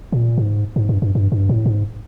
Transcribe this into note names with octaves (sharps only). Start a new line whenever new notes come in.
A#2
G#2
G#2
G2
G2
G2
G2
A2
G#2